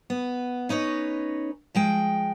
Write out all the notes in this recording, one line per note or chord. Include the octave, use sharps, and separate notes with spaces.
B3
C#4 D#4 B4 C#5
F3 G#3 G5